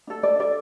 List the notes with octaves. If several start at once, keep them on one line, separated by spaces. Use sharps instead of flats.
D4 A4
D5
D4 A4 D5